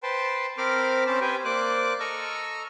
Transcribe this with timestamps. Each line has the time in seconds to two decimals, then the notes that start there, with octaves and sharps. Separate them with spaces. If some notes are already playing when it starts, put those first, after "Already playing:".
0.03 B4 C5 G5 A5 C6
0.58 C4 A#4 C5 B5 D6 F6
1.07 C4 C#4 C5 A5 B5
1.21 G4 B4 C5 G5 G#5
1.45 A#3 C5 D5 D6 F#6
2.00 A4 D#5 A#5 C#6 E6 F6